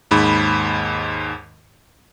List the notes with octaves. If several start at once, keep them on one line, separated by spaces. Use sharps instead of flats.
D#2 G#2 B5